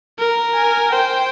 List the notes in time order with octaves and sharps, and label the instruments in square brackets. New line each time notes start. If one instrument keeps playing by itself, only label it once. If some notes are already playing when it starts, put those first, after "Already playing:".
[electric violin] A#4
[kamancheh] G#5
[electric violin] C5 [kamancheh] G5